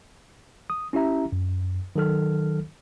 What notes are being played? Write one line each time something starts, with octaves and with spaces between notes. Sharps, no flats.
D#6
C#4 E4 G4 E5 A#5
F#2
D#3 F#3 A4 F6